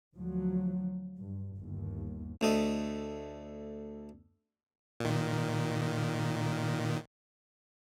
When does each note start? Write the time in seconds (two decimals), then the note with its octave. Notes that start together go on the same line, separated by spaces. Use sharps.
0.15 D2 F3 F#3
1.17 G2
1.57 G1 D#2
2.41 D2 A3 D#5
5.00 A#2 D#3